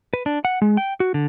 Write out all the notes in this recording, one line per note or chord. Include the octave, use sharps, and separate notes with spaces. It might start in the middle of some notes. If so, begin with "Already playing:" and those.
B4
D4
F#5
G#3
G5
F#4
D3